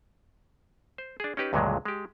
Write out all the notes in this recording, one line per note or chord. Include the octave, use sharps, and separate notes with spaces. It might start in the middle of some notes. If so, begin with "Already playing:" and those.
C5
D4 G#4
C#4 D#4 G4 B4
C#2 G2 A#2 D3 F#3 G#3
G#3 G4